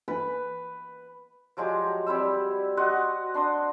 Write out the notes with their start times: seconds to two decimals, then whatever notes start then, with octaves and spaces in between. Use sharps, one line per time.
0.08 B4
1.57 F3 F#3 G#3 G4
2.06 G3 C4 E4 E6
2.77 F#4 D#5 F#5 C6
3.34 D4 C6 D#6